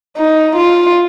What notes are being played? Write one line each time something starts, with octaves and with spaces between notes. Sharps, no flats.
D#4
F4